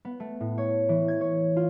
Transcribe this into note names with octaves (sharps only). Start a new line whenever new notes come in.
B3
A3
A2
C#5
E3
G#6
C#5
F4